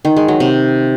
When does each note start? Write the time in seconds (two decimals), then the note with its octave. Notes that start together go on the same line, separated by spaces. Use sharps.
0.05 D#3
0.16 G#3
0.28 F#3
0.40 C3